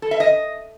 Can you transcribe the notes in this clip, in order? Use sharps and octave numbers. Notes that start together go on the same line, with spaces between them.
A4
E5
D#5